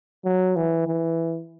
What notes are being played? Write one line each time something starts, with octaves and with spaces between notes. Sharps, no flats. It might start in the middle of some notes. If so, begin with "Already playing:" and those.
F#3
E3
E3